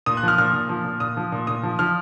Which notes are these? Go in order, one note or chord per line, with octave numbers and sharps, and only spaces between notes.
A#2 D#6
F#6
F3 F6
A#2 F6
A#2
F3
A#2
A#2 D#6
F3
A#2
A#2 D#6
F3
F3 F6